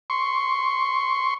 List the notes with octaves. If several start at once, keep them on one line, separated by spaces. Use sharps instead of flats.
C6 C#6